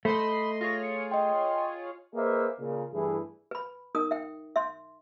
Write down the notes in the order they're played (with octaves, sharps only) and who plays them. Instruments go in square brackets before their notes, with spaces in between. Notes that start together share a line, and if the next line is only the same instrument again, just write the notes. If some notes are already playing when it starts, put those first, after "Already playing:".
[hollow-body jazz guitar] A3 [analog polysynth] C5 D#5 C6 [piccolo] B5
[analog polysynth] F4 G#4 C#5 [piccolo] A#6
[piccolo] C#7
[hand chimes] D#5 G5 [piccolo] C6
[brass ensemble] A#3 G#4 B4 C5 D#5 E5
A#2 C#3
G2 E3 A3 E4 G#4
[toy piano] B4 B5
D#4 A#4 D#6
E5 G5
E5 C6